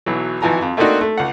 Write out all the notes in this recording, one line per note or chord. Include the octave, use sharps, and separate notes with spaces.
B1 E3 F#3
G#1 E3 F3 G#5 A#5
F2
A3 A#3 C4 D4 D#4 F#4
A3
C#2 F#5